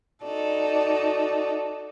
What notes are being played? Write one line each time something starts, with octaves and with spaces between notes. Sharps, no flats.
D#4 F#4 A4 D5